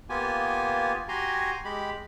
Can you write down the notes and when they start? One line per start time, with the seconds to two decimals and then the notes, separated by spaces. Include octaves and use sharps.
0.09 A#3 B3 F4 G4 G#5
1.08 F#4 G4 G#5 A#5 C6
1.64 G#3 G4 B5